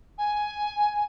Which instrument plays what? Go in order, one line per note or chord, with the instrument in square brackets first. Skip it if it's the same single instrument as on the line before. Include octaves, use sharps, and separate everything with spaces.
[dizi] G#5